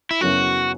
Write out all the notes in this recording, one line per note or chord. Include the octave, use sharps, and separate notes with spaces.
E4
F#2 C#3 F#3 B3 E4 F#4